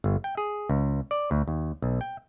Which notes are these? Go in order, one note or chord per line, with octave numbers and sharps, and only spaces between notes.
G1
G5
G#4
C#2
D5
D2
D#2
B1
G5